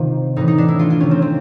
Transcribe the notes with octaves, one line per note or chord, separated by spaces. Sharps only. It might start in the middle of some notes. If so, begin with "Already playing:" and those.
Already playing: C3 D#3 F4 C5
A2 E3 D#4
D#4
D4
E4
F4
F4
C3 D#3 C#4
C4
C4